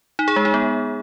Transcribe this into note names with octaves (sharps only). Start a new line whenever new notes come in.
D#4
G#4
G#3
D#4
B3